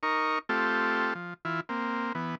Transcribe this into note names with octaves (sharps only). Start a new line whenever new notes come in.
D#4 A#4 C#6
A3 C4 F4 G4 A4
F3
E3 E4 F4
A#3 C4
E3 B3